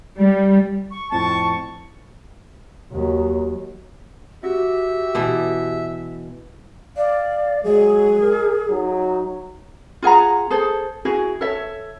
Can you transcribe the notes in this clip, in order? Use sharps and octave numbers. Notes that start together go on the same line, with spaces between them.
G3
C#6
F2 A2 A5 C#6
D#2 F#3
F#4 G4 E5
B2 E3
D5 F5
F#3 G#3 G#4
A#4
F#3 D#4
F4 G#4 F#5 A#5
G#4 A4 C5
E4 F#4 G#4
A4 C#5 E5